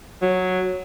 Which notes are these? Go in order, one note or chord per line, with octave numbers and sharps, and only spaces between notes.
F#3